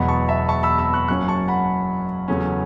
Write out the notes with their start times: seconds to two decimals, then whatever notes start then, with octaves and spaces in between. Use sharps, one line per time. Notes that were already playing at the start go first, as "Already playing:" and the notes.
Already playing: E1 E2 B2 F#3 B3 F#5 B5
0.08 A5 C#6
0.29 E5 A5
0.49 A5 C#6
0.63 B5 E6
0.78 B5 E6
0.93 C#6 F#6
1.08 F#1 F#2 F#3 C#4 C#6 F#6
1.28 A5 C#6
1.48 F#5 B5
2.28 E2 C#3 F#3 A3 C#4